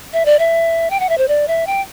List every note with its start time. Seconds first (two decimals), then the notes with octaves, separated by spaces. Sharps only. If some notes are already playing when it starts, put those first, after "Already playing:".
0.13 E5
0.25 D5
0.39 E5
0.90 G5
1.00 F#5
1.09 E5
1.18 C5
1.28 D5
1.48 E5
1.67 G5